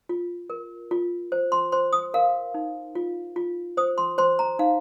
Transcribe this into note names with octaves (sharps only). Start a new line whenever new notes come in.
F4
A#4
F4
C5
C6
C5 C6
D#6
A#4 F5
D#4
F4
F4
C5 D#6
C6
C5 C6
A#5
D#4 F5